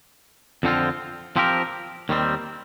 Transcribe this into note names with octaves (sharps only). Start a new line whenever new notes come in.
F2 D3 F3 C4 F4
F3 C4 G4 A#4
D#2 D#3 G3 C4